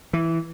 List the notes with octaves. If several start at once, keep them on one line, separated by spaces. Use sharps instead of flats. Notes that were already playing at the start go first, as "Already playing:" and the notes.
E3